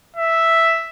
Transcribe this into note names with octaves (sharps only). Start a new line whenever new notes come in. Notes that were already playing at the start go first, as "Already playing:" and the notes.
E5